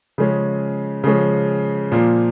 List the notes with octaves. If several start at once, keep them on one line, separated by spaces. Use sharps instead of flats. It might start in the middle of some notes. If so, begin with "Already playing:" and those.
C#3 F3 G#3 C#4
C#3 F3 G#3 C#4
A#2 F3 A#3